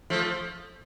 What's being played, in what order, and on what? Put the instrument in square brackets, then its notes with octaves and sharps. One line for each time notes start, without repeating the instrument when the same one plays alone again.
[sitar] F3 A3